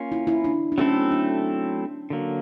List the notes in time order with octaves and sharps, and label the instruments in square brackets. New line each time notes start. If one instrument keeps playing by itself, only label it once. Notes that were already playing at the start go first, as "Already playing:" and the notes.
Already playing: [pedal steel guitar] A#3 C#4 F4
[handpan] E4
E4
D4
D4
[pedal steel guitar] F#3 A3 C4 E4 A4 [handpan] C#4
[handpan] D4
[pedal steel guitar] D3 F#3 A#3